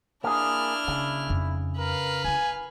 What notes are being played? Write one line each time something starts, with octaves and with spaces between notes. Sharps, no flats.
A#3 D4 E4 G#4 F6
C#3 A#3
F2 D#4
A#4 B4 F5
E4 F4 G#5